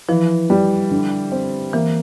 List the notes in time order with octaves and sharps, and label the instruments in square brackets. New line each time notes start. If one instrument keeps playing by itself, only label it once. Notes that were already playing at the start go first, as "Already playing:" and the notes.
[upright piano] E3 [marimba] F3
[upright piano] G3
D3
C4
[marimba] E3 [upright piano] A#3